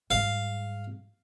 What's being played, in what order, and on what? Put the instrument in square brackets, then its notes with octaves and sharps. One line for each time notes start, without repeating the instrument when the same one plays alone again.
[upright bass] G#2 G3 [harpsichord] F5